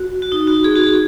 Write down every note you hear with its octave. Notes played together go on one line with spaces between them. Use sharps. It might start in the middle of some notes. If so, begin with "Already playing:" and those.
Already playing: F#4
F#4
D#4
F#4
G#4
F#4
G#4